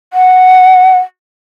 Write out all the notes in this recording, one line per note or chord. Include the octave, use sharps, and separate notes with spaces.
F#5